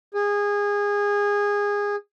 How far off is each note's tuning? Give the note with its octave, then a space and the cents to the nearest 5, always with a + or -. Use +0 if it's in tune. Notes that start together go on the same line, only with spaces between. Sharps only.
G#4 -20